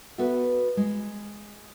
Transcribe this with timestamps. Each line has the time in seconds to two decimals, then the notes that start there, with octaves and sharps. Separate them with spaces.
0.18 B3 F#4 A4 E5
0.77 G#3